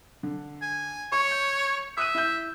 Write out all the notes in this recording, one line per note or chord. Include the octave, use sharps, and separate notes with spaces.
D3
G#5
C#5 C#6
G6
E5 D#6 F#6 D#7
E4 G6